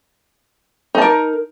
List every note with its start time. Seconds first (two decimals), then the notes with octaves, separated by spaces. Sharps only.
0.95 D#4
0.98 A5
1.02 A#4